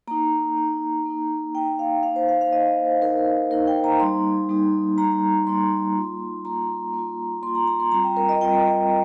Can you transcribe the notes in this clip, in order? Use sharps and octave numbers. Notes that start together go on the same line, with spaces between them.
A#3 D#4 A#5
A#3 D#4
A#3 D#4
A#3 D#4 G5
F5
A#3 D#4 F5
C5
F5
F5
A#3 D#4 D#5
C5
A#3 D#4 A#4
A#3 D#4 A#4
G5
A#5
G3 A#3 D#4 C6
G3 A#3 D#4
G3 A#3 D#4 A#5
G3 A#3 D#4 C6
A#3 F4
A#3 F4 A#5
A#3 F4
A#3 F4 C6
A#5
A#5
C6
G3 C4 F4 A#5
G5
A#4
D#5
G3 C4 F4 G5